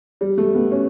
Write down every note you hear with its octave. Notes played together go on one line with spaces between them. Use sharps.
G3
A3
B3
C#4